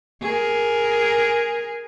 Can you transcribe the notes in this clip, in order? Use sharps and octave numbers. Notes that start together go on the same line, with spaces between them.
G#4 A#4